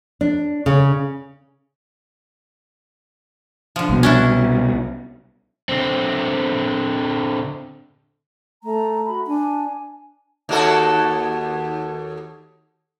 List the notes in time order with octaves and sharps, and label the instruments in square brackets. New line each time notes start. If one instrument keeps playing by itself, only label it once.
[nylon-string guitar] D4
C#3
[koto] D3 F3
[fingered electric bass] C2 B2
[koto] C#4 D4 E4
[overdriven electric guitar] D3 C4
[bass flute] A3 [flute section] A#5
[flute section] F#4 B5
[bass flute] D4 [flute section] G#5
[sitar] D#2 F#4 A4